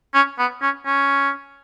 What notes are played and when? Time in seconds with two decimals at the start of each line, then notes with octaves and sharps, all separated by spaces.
0.14 C#4
0.39 B3
0.62 C#4
0.86 C#4